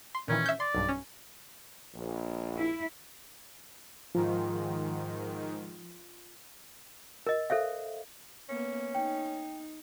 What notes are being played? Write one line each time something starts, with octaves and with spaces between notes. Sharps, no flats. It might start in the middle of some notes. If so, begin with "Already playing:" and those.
C6
A#2 D#3 E3 C#4
E5 G6
D5 C6
B1 G2
C#4
A#1
E4
G#2 D#3 F3 F4
A#4 D#5
A4 C5 E5 F5
A#3 B3 C#4
D#4 G5